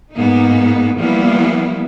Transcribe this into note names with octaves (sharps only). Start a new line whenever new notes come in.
G#2 A#3 B3 D#4
E3 F3 G3 A#3 B3 E4